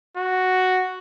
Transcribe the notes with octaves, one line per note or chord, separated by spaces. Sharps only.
F#4